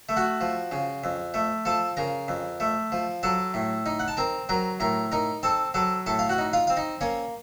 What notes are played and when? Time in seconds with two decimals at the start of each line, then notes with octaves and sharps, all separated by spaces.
0.09 A3
0.16 F#4 F#5
0.41 F3
0.72 C#3
1.04 F2
1.34 A3
1.65 F3 A4 A5
1.97 C#3 A#4 A#5
2.28 F2
2.60 A3
2.92 F3
3.23 F#3 A4 A5
3.54 A2
3.86 D#4
3.99 F#5
4.08 A5
4.17 C4 A#4 A#5
4.49 F#3 A#4 A#5
4.80 A2 A#4 A#5
5.12 D#4 A#4 A#5
5.43 C4 A4 A5
5.74 F#3 A4 A5
6.06 A2 A4 A5
6.19 F5
6.29 F#4 F#5
6.38 D#4
6.53 F4 F5
6.67 C4 F5
6.77 D#4 D#5
7.01 A#3 C#4 C#5